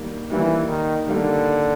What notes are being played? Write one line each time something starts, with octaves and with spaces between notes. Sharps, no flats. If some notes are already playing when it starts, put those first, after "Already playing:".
Already playing: D#3 G3 A#3
D#3 E3 G3 A#3
D#3
D3 D#3 G3 A#3